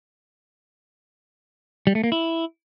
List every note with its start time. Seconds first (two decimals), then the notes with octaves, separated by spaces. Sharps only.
1.87 G3
1.95 A3
2.04 A#3
2.12 E4